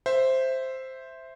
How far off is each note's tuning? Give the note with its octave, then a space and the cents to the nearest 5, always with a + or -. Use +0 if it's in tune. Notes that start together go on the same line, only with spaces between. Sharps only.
C5 +0 E5 +0